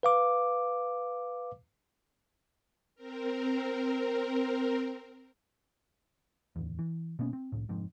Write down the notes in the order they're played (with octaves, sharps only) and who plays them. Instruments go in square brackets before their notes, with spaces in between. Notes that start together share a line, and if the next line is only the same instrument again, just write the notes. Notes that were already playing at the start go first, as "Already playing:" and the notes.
[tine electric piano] B4 F5 D6
[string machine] C4 A#4
[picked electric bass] D1 E2
E3
B2 A#3 B3 C#4
C4
C2 A2
F1 F2 G#2